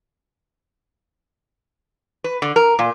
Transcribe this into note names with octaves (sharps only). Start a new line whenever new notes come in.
B4
D3
A#4
A#2